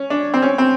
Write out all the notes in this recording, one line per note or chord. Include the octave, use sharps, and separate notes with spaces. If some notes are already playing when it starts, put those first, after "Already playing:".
Already playing: C#4
D4
C4
C#4
C4